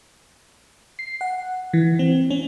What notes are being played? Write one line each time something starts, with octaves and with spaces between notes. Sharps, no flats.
C7
F#5
E3
C4
C#4